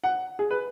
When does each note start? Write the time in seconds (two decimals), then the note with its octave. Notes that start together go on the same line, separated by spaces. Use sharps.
0.04 F#5
0.39 G#4
0.51 B4